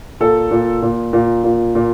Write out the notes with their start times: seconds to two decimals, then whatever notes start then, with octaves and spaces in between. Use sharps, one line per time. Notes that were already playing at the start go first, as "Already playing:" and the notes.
0.20 A#2 A4
0.51 A#2
0.82 A#2
1.13 A#2
1.44 A#2
1.75 A#2